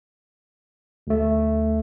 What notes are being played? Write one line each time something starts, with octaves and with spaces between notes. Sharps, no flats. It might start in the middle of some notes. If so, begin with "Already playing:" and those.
D2 A3